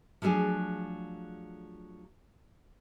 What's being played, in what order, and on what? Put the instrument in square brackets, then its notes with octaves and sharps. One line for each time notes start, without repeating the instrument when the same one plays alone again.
[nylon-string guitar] F3 F#3 A3 D4 G#4